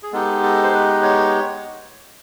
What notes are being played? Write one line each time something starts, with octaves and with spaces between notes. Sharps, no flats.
G#4
G#3 B3 D#4 G4 A4
A4
C5
B4
C#5